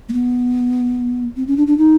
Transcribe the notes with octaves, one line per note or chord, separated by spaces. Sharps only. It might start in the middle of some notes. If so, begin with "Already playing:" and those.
A#3
B3
C4
C#4
D4
D4
D#4